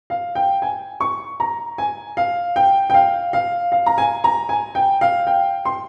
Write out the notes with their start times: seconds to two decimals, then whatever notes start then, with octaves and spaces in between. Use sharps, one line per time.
0.10 F5
0.35 G5
0.62 G#5
1.00 C#6
1.40 A#5
1.78 G#5
2.17 F5
2.56 G5
2.90 G5
2.94 F5
3.33 F5
3.72 F5
3.86 A#5
3.98 G#5
4.24 A#5
4.49 G#5
4.75 G5
5.01 F5
5.27 G5
5.65 C6